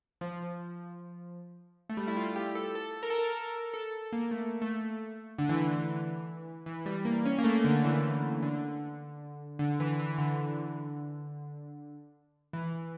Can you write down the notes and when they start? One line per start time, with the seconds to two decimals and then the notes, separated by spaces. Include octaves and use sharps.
0.21 F3
1.89 A3
1.97 G3
2.08 E4
2.17 F4
2.36 G4
2.55 A4
2.75 A4
3.03 A#4
3.10 A4
3.19 A#4
3.74 A4
4.12 A#3
4.31 A3
4.62 A3
5.38 D3
5.49 E3
6.66 E3
6.86 G3
7.05 A#3
7.26 C#4
7.38 A#3
7.44 A3
7.64 D3
7.84 E3
8.42 D3
9.59 D3
9.80 E3
9.99 E3
10.18 D3
12.53 E3